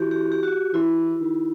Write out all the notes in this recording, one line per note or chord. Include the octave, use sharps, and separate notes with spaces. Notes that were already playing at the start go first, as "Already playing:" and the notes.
Already playing: E3 F#4 G4
G4
G4
F#4
E3 E4
D#3